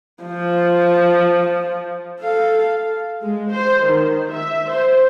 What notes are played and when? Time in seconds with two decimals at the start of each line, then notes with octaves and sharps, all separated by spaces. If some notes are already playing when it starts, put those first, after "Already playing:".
0.24 F3
2.21 A4 F5
3.22 G#3
3.52 C5
3.83 D#3
4.31 E5
4.68 C5